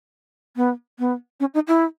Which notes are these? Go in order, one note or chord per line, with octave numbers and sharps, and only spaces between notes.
B3
B3
C#4
D#4
E4